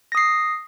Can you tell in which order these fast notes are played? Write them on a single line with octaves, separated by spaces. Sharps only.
A#6 D#6 C7